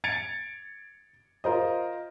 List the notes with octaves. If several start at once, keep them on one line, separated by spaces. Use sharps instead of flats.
G#6 A6 C#7 D7 F7
F4 A#4 C5 D#5